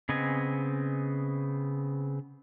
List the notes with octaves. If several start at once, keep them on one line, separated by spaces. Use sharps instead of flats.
C#3 B3 C4 D#5 G#5